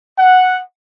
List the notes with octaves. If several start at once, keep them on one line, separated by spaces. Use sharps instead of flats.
F#5